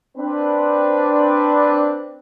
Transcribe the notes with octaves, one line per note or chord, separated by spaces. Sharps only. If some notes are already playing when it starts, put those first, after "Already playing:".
C4 D4 B4